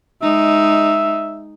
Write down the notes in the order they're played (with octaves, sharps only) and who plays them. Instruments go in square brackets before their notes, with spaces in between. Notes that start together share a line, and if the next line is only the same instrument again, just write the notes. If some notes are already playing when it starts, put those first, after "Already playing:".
[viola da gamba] G#3 D#4 [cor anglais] E5